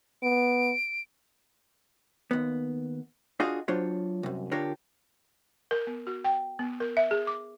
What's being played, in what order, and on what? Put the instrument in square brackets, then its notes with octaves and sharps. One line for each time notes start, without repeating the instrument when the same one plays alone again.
[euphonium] B3 [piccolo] D7
[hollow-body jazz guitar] D#2 B3
D4 F4 F#4 G#4 D#5 F5
F#3 D4 F4 C5 C#5
C2 F#2
D3 D4 F4 G4 A#4 C#5
[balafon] A#4
B3
F#4
G5
B3
A#4
E5
G#4
D6